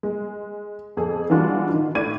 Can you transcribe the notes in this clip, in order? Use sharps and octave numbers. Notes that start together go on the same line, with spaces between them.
G#3
F2 G#4 A4
E3 G3 G#3 D4 F4 F#4
D#3
A2 D5 G#6 D#7